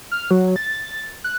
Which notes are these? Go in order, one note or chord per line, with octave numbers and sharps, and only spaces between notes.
F6
F#3
A6
F#6